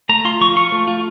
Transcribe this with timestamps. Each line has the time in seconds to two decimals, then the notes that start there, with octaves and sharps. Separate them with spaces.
0.09 A3 A#5
0.25 F4 C6
0.41 F3 C#6
0.56 F4 C#6
0.72 A3
0.87 F4